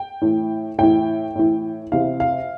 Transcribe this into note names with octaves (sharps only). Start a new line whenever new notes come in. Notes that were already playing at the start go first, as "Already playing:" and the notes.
Already playing: G5
A2 E3
A2 E3 G5
A2 E3
C3 E3 F5
F5